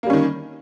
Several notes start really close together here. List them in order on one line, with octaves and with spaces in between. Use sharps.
A#3 G3 C#4 D#3